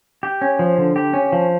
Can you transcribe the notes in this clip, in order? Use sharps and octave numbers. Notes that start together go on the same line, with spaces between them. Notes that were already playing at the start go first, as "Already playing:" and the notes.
G4
C#4
F3
D3
G4
C#4
F3